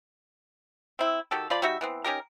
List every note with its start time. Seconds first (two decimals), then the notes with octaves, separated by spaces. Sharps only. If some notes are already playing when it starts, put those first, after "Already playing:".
0.99 C4 E4
1.31 D#3 F#4 G4 A4
1.50 F3 F4 D5 B5
1.62 G3 D#4 F#4 E5
1.81 E3 B3 C4
2.04 C#4 D#4 G4 A#4